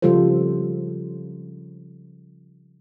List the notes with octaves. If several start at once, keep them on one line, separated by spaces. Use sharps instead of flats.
C#3 F3 G3 F4 A4 C5